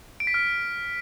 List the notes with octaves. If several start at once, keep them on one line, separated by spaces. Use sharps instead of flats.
D7
B6
F6